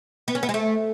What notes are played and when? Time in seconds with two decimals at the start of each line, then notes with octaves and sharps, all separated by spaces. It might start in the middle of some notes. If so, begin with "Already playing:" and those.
0.28 B3
0.35 C#4
0.43 B3
0.49 G#3
0.54 A3